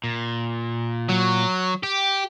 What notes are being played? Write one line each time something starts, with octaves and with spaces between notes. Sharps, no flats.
A#2
F#3
G4